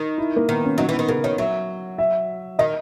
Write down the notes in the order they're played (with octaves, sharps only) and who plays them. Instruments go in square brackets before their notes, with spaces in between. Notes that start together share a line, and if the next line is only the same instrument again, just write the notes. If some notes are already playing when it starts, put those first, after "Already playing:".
Already playing: [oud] D#3
[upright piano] E4
A#3
[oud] D#3 [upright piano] B3
[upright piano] C#4
[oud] F#3 [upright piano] D#4
[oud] E3 [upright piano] B3
[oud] D#3
[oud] C#3 [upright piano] A#4
[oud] D#3 [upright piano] C#5
[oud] F#3 [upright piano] E5
[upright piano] E5
[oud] D#3 [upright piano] D#5